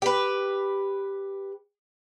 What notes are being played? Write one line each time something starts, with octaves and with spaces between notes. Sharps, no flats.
G4 B4